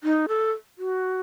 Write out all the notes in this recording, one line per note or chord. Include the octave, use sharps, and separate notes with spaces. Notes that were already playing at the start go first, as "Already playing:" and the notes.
D#4
A4
F#4